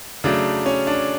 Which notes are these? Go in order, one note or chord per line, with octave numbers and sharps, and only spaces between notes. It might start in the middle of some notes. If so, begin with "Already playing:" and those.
C#3 F#3 A3 D4
C#4
D4